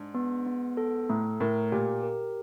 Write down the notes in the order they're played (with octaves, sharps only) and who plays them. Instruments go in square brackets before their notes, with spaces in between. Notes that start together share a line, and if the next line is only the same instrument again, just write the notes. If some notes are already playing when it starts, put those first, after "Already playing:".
Already playing: [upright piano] G#2 [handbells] D4
[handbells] B3
B3
A4
[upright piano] A2 [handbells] A3
[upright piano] A2 [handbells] A#4
[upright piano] A#2 [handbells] G4
[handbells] A#4